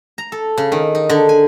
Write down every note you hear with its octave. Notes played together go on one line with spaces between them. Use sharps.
A#5
A4
C#3
D#3
D#4
D3
G#5